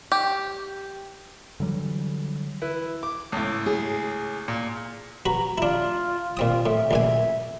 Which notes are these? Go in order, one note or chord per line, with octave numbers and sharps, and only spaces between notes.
G4
D3 E3 F#3 G3
E4 B4
D6
C#2 A2
G#4
A#2
F#4 B4 A#5
D4 E4 F4
A#2 C4 F4 D#6
A2 E5
C#2 A#2 G#5